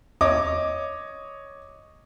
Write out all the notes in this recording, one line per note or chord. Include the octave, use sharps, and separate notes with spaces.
C#5 D#5 D6